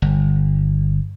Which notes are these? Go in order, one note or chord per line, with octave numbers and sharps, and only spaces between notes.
G1